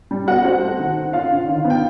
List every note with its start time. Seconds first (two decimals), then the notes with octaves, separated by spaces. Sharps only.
0.11 G3
0.28 B3 F#4 F#5
0.44 C4 F#4 F#5
0.61 A3
0.79 D#3
0.96 C4
1.13 C#4 F4 F5
1.30 D3
1.48 D#3
1.64 B3
1.70 G5